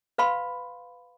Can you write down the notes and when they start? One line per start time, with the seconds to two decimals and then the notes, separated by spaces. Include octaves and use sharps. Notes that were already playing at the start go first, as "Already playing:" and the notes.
0.18 B4 F5 B5 C6